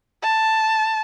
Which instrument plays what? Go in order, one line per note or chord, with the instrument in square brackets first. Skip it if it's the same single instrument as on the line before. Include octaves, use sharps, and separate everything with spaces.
[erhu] A5